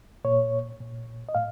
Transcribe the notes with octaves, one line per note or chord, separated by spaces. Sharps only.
A#2 C#5
A#2
D#5
A2 F5